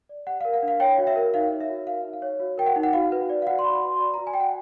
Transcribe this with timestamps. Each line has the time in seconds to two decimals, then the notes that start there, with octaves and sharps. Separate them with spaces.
0.09 D5
0.27 G4 F#5
0.41 F5
0.45 A#4
0.54 F5
0.63 D4
0.68 F5
0.80 C#5 G5
0.98 F#4
1.07 E5
1.16 A#4
1.34 D#4 F5
1.52 C#5
1.60 E5
1.69 F#4
1.87 A#4 F5
2.04 D#4
2.13 F5
2.22 C#5
2.40 F#4
2.58 A#4 G5
2.66 F#5
2.76 D#4
2.83 F#5
2.93 F#4 F5
3.12 B4
3.30 D5
3.42 F5
3.47 F#4 F#5
3.59 C6
3.65 F#4 B5
3.75 B5
3.83 B4 C6
3.93 C6
4.00 D5 B5
4.14 A#5
4.18 F#4
4.27 G#5
4.34 F#4 G5
4.40 F#5